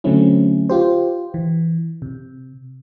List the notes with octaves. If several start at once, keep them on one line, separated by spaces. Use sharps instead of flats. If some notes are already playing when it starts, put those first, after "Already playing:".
D3 F#3 A3 C4 C#4 E4
F4 G4 C5
E3
C3